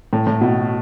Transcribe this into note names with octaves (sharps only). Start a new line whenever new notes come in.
A2
A2
B2